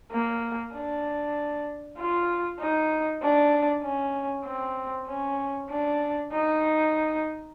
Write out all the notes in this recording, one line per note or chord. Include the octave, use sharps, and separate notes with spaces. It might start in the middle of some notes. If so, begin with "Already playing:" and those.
A#3
D4
F4
D#4
D4
C#4
C4
C#4
D4
D#4